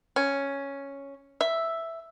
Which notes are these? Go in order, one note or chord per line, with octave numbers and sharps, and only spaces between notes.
C#4
E5